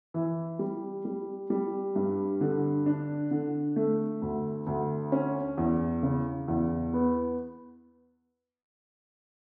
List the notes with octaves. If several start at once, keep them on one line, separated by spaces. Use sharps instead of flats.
E3
G3
G3
G3
G2
D3
D4
D3
A3
D2
D2
C#4
E2
C#3
E2
B3